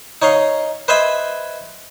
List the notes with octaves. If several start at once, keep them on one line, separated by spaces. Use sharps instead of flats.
D#4 C#5 D#5 F5
B4 C5 D#5 E5 G#5 B5